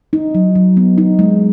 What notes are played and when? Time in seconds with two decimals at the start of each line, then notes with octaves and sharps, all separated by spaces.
0.13 D#4
0.35 F#3
0.55 F#3
0.77 B3
0.98 D#4
1.19 G#3